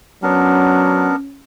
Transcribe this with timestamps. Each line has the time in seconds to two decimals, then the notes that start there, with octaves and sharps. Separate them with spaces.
0.23 F#3 B3 C#4 D4 A#4